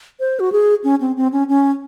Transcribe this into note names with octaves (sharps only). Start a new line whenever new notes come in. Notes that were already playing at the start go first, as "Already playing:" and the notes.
C5
F#4
G#4
C#4
C4
C4
C#4
C#4